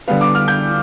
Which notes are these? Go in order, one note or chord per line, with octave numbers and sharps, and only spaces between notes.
D3 G3 B3 F5
D6
F6
G6